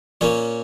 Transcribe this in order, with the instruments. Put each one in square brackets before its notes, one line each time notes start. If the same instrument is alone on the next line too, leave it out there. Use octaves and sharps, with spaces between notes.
[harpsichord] A#2 A#3 C#4 C#5